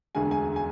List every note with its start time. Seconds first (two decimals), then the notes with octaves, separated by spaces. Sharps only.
0.15 E1 D2 D3 G#3 G#5
0.31 G#5
0.56 G#5